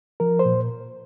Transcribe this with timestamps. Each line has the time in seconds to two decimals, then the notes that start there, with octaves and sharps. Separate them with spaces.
0.20 F3 A#4
0.39 C5
0.45 A#2